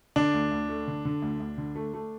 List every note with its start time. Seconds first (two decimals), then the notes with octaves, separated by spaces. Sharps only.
0.16 D3 D4
0.34 D2
0.51 D2
0.69 A3
0.88 D3
1.05 D3
1.22 D2
1.40 D2
1.58 D3
1.76 A3
1.93 A3